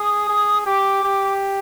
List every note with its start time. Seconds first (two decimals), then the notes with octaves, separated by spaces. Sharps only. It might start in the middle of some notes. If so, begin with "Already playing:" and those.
Already playing: G#4 D#6
0.30 G#4
0.66 G4 D6
1.03 G4